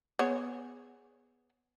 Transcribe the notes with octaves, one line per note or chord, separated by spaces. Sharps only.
B3 G#4 C#5